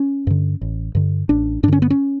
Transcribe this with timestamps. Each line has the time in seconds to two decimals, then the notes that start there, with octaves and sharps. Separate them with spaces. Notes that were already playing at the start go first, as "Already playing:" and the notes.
Already playing: C#4
0.27 G2 D3
0.61 A1
0.95 G2 D3
1.29 A1 D4
1.63 G2 D4
1.68 D3 C#4
1.82 B3
1.90 C#4